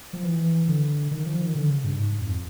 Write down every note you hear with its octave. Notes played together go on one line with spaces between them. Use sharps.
F3
E3
D3
D#3
F3
D#3
D3
C#3
G2
G#2
F2